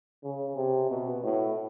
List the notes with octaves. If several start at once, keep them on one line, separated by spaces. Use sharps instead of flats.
C#3
C3
B2
A2